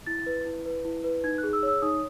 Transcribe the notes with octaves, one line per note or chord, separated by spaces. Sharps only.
E4 A6
B4
E4
B4
E4
B4
D#4 G#6
F#6
G#4
E6
C#5
E6
D#4 D#6